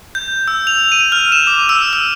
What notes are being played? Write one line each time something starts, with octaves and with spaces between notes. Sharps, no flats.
G6
E6
F7
D#7
F6
E7
D6
E6
E6